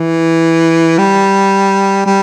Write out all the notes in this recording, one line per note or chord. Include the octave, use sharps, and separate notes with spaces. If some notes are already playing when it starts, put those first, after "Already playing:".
Already playing: E3
G3
G3